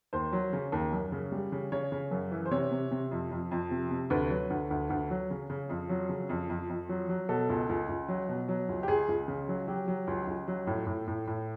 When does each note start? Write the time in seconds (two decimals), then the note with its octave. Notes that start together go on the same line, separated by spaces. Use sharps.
0.13 D#2 C5
0.33 F#3
0.53 C#3
0.72 D#2
0.92 F#2
1.12 C#3
1.32 G3
1.52 C#3
1.72 C#3 C#5
1.92 C#3
2.11 F#2
2.31 E3
2.46 C5
2.51 C3 C#5
2.71 C3
2.91 C3
3.11 F2
3.32 F2
3.51 F2
3.71 C3
3.91 C3
4.10 D2 B4
4.30 F#3
4.50 D2
4.70 D2
4.90 D2
5.11 F#3
5.30 C#3
5.50 C#3
5.69 F2
5.89 F#3
6.09 C#3
6.29 F2
6.50 F2
6.70 F2
6.89 F#3
7.09 F#3
7.29 B2 A4
7.49 C#2
7.69 C#2
7.89 C#2
8.09 F#3
8.29 B2
8.48 F#3
8.69 C#2
8.83 G4
8.88 C#2 G#4
9.09 C#2
9.28 C#3
9.48 F#3
9.68 F#3 G4
9.88 F#3
10.07 C#2
10.27 C#2
10.48 F#3
10.67 A2
10.87 A2
11.07 A2
11.27 A2